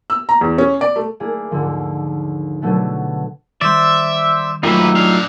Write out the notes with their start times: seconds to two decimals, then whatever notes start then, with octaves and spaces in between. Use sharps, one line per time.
0.10 E6
0.29 A#5
0.41 E2
0.58 C#4
0.81 D5
0.96 A3
1.20 A3 A#3 E4 G#4 D5
1.51 D#2 G#2 D3 F3
2.62 B2 D3 F#3 A3 B3
3.61 D#3 G3 C5 D5 E5
4.63 F#3 A3 A#3 D#4 F4 G4 B4 E5
4.96 D4 F5